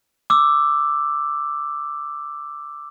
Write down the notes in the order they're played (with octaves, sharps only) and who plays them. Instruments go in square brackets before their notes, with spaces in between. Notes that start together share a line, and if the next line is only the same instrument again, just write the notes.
[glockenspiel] D6 E6